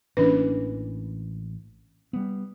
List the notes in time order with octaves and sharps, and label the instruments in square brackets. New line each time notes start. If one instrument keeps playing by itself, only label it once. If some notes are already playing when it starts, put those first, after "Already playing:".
[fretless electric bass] A1 E3 A#3 [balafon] C#4 D4 B4
[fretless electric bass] G3 B3